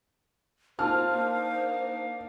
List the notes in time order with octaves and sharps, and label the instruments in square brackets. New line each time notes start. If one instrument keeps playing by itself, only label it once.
[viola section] A#3 C4 F4 [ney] C5 [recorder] F5 [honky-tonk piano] A5 F6
[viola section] A#3 D4 D#4